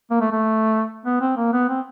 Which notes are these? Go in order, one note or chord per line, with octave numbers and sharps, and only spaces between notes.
A#3
A3
A3
B3
C4
A#3
B3
C4